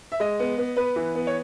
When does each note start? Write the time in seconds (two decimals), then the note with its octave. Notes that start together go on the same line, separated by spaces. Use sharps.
0.12 E5
0.20 G#3 D#5
0.39 B3
0.58 B3
0.76 B3 B4
0.96 E3
1.15 B3
1.27 C#5